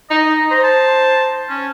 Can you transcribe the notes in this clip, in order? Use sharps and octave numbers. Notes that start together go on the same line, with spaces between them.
D#4 D#5
C5 A#5
A5
C#4